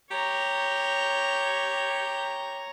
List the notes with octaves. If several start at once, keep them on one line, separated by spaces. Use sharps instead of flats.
G4 C#5 A#5